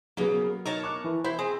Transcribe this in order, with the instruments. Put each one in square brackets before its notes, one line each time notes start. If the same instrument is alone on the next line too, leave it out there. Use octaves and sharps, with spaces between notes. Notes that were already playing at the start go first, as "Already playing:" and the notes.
[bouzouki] C#3 A#3 [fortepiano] F#3 B3
[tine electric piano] D#4 [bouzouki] A#4 C#5 A5
[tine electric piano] C#6 [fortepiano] D6 F#6
[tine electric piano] E3 E4
[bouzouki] E4 [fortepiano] C5 [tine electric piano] B5 C6
[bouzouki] C4 [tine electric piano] G#4